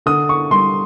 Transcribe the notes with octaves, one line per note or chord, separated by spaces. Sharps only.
D3 D#6
C#6
G3 C6